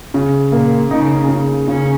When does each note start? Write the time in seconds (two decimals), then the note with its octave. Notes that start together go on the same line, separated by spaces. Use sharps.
0.14 C#3
0.52 A#2 A#3
0.90 C#3 D#4
1.29 C#3
1.67 C#3 C#4